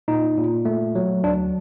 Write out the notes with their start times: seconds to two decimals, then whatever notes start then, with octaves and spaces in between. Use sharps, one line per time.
0.08 A#2 D#4
0.37 A#2
0.65 A3
0.95 F#3
1.24 D2 D4